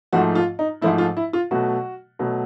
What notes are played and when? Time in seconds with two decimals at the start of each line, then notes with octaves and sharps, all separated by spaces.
0.13 G#2 F3 A3 F#4
0.35 F4
0.59 D#4
0.81 G#2 F3 A3 E4
0.98 F4
1.17 E4
1.33 F4
1.51 B2 F#3 A3 F#4
2.19 B2 F#3 A3